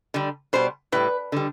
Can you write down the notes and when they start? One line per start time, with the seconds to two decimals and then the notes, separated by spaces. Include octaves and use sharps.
0.14 D3 G3
0.53 B2 G3 C5
0.92 A2 G3 B4
1.32 D3 G3